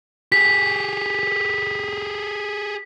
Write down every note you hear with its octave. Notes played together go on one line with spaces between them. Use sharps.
G4 G#4 B6